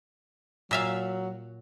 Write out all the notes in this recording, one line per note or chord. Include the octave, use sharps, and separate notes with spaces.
A#2 F#3 E5 F5